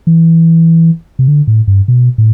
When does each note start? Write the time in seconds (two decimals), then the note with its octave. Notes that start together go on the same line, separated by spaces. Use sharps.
0.07 E3
1.19 C3
1.28 D3
1.47 A2
1.67 G2
1.88 B2
2.18 A2